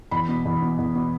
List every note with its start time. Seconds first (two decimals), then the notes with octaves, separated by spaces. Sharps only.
0.11 E2 B5
0.29 B2
0.45 E2
0.62 B2
0.79 E2
0.95 B2